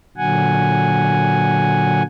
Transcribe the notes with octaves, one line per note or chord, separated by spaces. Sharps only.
A#2 D3 F#3 F#5 G#5